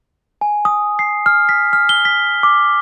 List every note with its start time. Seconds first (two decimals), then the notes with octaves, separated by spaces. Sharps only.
0.41 G#5
0.65 D#6
0.99 C7
1.26 F6
1.49 B6
1.73 F6
1.89 G7
2.05 B6
2.43 D6